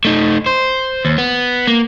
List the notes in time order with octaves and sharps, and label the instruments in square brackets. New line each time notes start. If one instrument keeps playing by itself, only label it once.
[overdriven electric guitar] A3 D#4
C5
D#2
B3
A#3